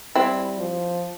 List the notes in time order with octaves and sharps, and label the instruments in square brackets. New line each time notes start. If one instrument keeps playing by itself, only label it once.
[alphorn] G3 [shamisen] C4 E4
[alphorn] F3